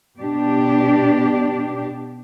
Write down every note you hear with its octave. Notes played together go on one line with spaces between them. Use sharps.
B2 D4 G4